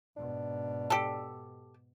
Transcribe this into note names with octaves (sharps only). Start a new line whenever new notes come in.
G#2 B2 D4
G4 A4